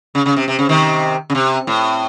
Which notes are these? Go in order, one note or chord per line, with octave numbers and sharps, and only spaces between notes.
C#3
C#3
C3
C3
C#3
C3 D#3
C#3
C3
A2